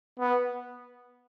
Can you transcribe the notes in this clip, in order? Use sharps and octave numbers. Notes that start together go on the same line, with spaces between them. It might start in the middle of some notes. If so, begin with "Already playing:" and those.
B3